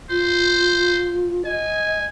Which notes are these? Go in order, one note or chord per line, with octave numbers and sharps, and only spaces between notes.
F4 C5
D#5 G#5